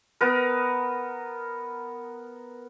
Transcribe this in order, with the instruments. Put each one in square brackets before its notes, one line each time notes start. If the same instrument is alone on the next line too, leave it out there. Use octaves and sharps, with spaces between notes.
[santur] B3 A#4